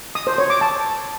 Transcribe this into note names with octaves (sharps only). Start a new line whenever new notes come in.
D#6
C5
C#5
D6
A5